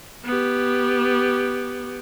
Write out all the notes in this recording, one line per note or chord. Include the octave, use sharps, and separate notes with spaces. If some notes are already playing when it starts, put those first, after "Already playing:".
B3 G4